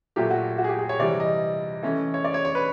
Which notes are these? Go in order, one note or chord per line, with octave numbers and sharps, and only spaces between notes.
A#2 F#3 A3 G4
F#4
F#4
G#4
G4
G#4
C#5
C3 E3 G3 D5
D#5
E3 A3 C#4
C#5
D5
C#5
C#5
B4